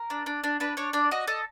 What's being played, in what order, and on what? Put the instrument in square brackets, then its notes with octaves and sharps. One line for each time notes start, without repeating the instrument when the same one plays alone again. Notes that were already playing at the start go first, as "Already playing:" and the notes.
Already playing: [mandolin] A#4
D4
D4
D4
D4 B4
D4 C#5
D4 D5
F#4 D#5
A4 D#5